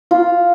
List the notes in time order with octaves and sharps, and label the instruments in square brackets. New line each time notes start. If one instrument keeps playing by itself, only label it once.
[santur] F4